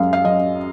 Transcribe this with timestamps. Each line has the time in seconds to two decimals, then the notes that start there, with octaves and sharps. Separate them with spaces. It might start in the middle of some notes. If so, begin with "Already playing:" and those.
Already playing: F#2 G#3 F5
0.13 F5
0.24 F#2 D#5